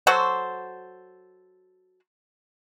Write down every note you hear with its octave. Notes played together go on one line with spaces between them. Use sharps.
F#3 F#4 A4 C5